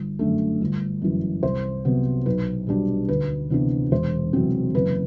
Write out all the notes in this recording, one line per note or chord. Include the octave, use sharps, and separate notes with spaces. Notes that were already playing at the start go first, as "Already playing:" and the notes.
Already playing: G1
F#2 D3 A3
G1
F#2 E3
C2 C5
C3 F#3 B3
B1 B4
B2 G3 D4
D2 B4
C3 E3 B3 D4
E1 C5
E2 C3 F#3 C4
F#1 B4